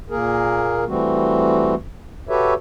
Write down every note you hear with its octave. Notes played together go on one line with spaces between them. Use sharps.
A#2 A#3 G#4 A#4
E3 G3 A3 C4 F#4
F#4 G4 A4 B4 C#5 E5